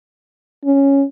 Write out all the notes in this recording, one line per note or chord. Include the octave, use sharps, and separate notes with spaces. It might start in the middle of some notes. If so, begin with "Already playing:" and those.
C#4